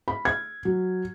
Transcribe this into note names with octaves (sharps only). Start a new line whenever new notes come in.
B5
G#6
F#3